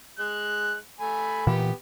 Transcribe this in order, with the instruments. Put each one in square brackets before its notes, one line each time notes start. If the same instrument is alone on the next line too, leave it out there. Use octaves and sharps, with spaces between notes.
[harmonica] G#3 [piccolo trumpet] F#6
[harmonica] A3 G#5 [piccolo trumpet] B5
[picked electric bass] A#2 E3 [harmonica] B3 G4